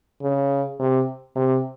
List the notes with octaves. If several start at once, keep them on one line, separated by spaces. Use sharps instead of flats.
C#3
C3
C3